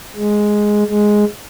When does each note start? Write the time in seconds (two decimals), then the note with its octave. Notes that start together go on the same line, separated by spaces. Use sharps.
0.16 G#3
0.88 G#3